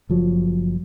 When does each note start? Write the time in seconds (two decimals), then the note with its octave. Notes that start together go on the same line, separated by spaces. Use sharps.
0.10 F#1 F3 F#3